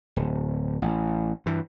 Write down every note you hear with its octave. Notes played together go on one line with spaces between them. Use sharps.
D1
A1
G2 E3